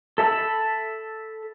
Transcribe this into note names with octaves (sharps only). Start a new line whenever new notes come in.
A4 E5 A5 B5